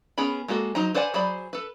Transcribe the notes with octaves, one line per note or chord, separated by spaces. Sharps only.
B3 C#4 G#4 A#4 B5
G#3 A#3 F#4 A4
F#3 D#4 C5 A#5
B4 C5 D5 F#5 G#5
F#3 G#4 C5 D5 B5
A4 B4